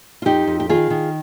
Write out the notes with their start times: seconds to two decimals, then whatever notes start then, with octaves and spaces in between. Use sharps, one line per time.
0.22 F4
0.25 F2 D#4 G4
0.47 F2
0.60 G4
0.69 D#3 F4 G#4
0.90 D#3